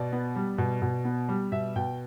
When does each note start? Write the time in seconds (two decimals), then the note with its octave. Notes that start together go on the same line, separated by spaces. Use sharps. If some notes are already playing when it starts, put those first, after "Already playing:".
Already playing: B2 D5
0.12 B3
0.36 G3
0.58 B2
0.82 B2
1.05 B3
1.29 G3
1.52 B2 E5
1.76 B2 G5